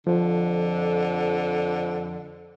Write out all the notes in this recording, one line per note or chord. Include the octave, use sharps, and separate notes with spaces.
F2 D3 F3